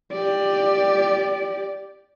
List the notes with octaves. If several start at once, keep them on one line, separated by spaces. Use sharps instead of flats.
G4 D5